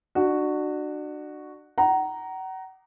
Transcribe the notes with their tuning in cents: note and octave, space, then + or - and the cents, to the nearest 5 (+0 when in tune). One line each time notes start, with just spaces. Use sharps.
D4 +30 F#4 +0
F#5 +35 A#5 +0